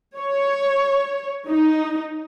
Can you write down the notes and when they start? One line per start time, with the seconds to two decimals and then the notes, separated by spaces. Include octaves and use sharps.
0.18 C#5
1.49 D#4